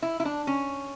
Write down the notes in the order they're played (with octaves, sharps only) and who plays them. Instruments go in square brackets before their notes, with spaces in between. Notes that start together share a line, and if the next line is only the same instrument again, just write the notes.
[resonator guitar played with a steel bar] E4
E4
D4
C#4